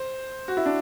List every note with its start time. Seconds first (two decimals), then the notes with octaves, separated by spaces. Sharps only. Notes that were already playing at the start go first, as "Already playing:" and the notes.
Already playing: C5
0.48 F#4
0.57 E4
0.65 D4